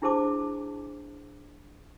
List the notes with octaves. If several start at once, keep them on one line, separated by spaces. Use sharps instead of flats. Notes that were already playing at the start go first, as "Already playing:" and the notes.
D4 E4 G#4 C5 A5 D6